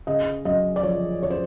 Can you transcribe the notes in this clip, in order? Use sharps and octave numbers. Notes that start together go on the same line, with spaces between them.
C#3 D#5
F#2 D#5
D5
F3 C#5
C#5
C5